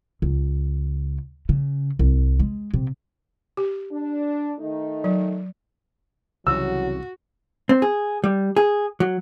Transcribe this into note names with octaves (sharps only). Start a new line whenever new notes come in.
C#2
C#3
C2
G#3
C3
G4
D4
D#3 A3 D#4
F#3
C2 C#3 E3 F#3 F#4 E6
C4
G#4
G3
G#4
F#3